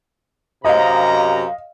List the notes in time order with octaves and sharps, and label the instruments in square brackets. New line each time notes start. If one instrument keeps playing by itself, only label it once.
[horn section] F#2 C3 A#5 [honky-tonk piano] D#5 F5